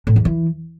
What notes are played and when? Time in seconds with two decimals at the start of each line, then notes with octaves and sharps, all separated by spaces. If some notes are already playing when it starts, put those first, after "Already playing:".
0.07 A2
0.16 E2
0.25 E3